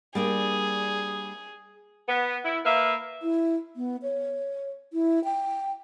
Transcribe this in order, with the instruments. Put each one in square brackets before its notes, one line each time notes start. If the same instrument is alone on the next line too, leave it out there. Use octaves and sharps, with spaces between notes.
[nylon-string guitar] G3 A#3 D4 [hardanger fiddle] G#4
[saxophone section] B3
E4
A#3 B4 E5 F5
[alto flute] E4
B3
C#5
E4
G5